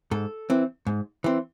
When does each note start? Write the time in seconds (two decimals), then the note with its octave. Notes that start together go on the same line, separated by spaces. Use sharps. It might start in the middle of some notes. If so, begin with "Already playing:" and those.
0.11 G#2 A4
0.50 E3 C4
0.87 G#2
1.24 E3 C4